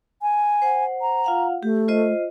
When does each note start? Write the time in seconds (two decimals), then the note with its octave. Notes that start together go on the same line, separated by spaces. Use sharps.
0.22 G#5
0.62 C5 F#5
1.01 A#5
1.24 F4 F5 F#5
1.63 A3 G4
1.88 F4 C5 D#5